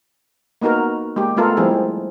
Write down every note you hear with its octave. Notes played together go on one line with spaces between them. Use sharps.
A#3 B3 D#4 F#4 A#4
G#3 A#3 G4
G#3 A3 B3 F4 A4 A#4
F3 G3 G#3 C4 E4 G#4